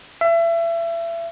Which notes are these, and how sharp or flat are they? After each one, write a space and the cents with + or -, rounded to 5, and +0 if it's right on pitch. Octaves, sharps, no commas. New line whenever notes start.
E5 +30